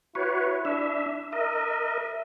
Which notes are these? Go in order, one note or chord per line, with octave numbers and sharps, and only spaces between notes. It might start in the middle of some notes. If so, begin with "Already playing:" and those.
E4 F#4 B4 C#5
D4 E5
A#4 D#5 E5